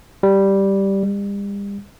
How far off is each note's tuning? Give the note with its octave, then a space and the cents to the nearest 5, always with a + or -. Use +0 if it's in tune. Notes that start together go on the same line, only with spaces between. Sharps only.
G3 -5
G3 +40